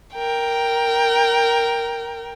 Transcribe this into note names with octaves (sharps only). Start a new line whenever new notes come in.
A#4 G5